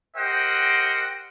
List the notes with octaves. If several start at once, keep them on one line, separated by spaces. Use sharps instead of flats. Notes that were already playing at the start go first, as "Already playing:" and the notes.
G4 A#4 C5 D#5 F#5 G5